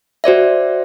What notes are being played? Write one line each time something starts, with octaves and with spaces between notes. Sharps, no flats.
F#4 C5 D5 E5